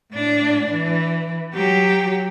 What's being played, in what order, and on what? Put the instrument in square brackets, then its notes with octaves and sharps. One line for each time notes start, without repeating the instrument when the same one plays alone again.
[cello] A2 D4
E3
F#3 G4